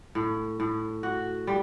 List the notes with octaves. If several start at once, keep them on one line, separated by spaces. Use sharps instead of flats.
A2
A2
F#4
G3